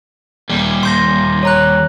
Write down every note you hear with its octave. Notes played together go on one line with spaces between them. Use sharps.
D#2 G3
C6 G6 A#6
C#5 A#5 F#6